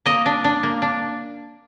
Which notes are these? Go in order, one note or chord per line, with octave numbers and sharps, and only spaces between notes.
A#3 D#5
D4
D4
A#3
D4